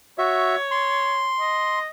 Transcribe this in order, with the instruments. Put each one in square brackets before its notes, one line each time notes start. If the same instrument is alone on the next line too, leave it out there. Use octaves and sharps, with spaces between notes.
[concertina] F#4 E5 [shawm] C#5
[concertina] C6
[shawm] D#5